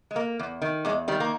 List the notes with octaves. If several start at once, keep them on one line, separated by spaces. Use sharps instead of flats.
G#3
A#3
E2
D#3
E2 G#3
D#3 G3
A#3